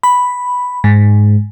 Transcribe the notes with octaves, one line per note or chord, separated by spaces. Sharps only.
B5
G#2